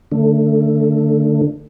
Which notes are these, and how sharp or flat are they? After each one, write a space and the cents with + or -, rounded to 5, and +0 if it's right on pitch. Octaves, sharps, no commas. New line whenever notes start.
D3 +5 A3 +20